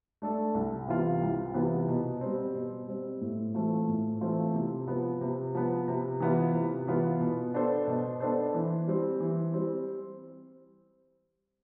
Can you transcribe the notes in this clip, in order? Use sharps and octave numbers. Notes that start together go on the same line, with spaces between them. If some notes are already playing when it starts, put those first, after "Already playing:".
A3 D4 A4
C2
C3 E3 B3 F4
C2
C3 E3 B3 F4
B2
G3 C4
B2
G3 C4
A2
E3 A3 C4 F4
A2
E3 A3 C4 F4
C3
F3 B3
C3
F3 B3
C3
E3 B3 F4
C3
E3 B3 F4
B2
B3 D4 A4 C5
B2
B3 D4 A4 C5
E3
G3 C4
E3
G3 C4